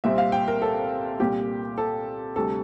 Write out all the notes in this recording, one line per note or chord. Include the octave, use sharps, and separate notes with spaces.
C2 A#2 G3 C4 E5
F5
G5
A#4
A4
C2 A#2 G3 G4
A4
D2 C3 G3 A4